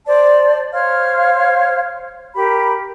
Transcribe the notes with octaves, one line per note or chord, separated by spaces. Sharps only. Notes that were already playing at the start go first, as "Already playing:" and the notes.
C5 D5 A5
C5 C#5 F5 F6
G4 A#4 B5